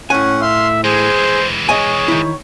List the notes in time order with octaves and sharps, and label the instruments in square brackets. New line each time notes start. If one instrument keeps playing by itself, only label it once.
[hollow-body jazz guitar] A2 G#5 [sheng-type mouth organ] C#4 F#5
[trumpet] E5 [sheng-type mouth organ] F5 C6
[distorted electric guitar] E3 G#3 [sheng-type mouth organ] G#4 [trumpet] C5
[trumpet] G#4 [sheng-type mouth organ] C#5 [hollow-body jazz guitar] D#5 G#5
[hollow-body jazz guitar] D#3 E4